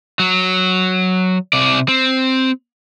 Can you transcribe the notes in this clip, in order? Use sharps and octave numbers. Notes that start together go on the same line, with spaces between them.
F#3
C3 D5
C4